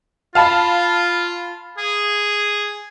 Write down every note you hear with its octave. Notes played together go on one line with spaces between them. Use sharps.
F4 F5 A5 B5
G#4